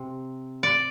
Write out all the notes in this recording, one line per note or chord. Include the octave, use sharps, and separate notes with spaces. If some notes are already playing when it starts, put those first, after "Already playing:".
Already playing: C3
D5